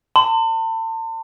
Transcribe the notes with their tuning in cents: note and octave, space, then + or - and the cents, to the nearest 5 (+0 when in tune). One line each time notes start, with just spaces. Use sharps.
A5 +40 C6 -40